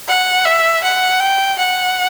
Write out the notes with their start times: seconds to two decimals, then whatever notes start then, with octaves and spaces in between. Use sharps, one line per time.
0.08 F#5
0.45 E5
0.83 F#5
1.20 G5
1.58 F#5